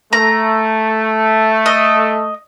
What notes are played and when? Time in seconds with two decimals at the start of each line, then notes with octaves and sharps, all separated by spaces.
0.13 A3 A#5
1.66 D#5